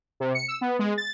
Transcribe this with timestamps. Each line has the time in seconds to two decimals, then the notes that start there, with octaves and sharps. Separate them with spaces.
0.20 C3
0.35 C#7
0.48 E6
0.61 B3
0.79 G#3
0.97 A6